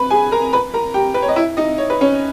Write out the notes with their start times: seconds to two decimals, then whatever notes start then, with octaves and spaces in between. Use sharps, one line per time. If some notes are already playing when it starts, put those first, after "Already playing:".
Already playing: B4 B5
0.10 G#4 G#5
0.32 A#4 A#5
0.53 B4 B5
0.74 A#4 A#5
0.94 G4 G5
1.14 B4
1.22 C#5
1.28 D#5
1.36 E4 E5
1.57 D#4 D#5
1.78 C#5
1.90 B4
2.01 C#4 C#5